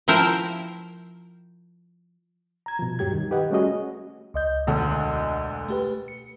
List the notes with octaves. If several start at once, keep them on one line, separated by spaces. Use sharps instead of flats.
F3 E4 A#4 C5 G5
A#5 G#6
B2 F3
D2 G2 F#3 G4 G#6
D#3 G3
G4 B4 D#5 F#5
G3 A3 C#4 F#4 G#4 D#5
C#2 D#5 G6
E1 D2 D3
A3 G4 B4
C#7